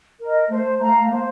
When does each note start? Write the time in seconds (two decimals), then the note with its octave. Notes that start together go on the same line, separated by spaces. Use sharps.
0.21 A#4 D#5
0.50 A3 C5
0.80 A3 F5 A#5
1.01 A3
1.10 A#3 C5